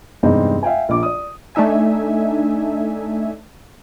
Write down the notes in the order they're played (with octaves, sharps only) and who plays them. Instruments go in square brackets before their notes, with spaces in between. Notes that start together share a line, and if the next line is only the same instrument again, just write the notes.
[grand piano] E2 G2 C3 G#3 C4 D#4
E5 F5 G5 G#5
A#1 D6
D5 D#6
[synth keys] A3 D4 D#4 E5 G#5